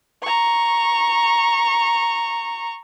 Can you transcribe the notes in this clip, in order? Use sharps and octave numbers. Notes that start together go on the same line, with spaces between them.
A#5 C#6